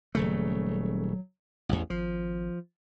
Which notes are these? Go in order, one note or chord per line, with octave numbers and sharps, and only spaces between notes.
D#1 C#3 F#3 A3
A1 E2
G#1 F3